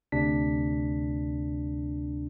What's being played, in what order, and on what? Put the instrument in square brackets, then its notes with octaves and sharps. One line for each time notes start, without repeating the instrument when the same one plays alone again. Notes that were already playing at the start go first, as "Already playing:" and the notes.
[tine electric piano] D2 C3 D4 B6